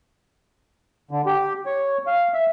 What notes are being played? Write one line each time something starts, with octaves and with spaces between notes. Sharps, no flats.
D3
G4
C#5
F5
E5